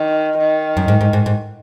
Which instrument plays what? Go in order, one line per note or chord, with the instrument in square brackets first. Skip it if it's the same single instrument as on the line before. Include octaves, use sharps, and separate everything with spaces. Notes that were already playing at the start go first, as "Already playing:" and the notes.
Already playing: [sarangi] D#3
D#3
[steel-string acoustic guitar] F#2
G#2
G#2
G#2
G#2